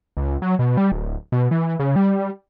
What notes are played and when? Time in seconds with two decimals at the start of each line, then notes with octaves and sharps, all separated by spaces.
0.17 C#2
0.42 F#3
0.59 B2
0.77 G3
0.92 D1
1.32 B2
1.51 E3
1.80 C#3
1.96 G3